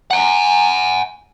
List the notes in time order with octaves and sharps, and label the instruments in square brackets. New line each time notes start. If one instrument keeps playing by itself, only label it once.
[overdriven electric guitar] F#5 G#5